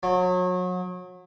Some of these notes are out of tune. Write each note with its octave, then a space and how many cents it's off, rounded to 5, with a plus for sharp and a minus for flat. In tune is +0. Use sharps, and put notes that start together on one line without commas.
F#3 -30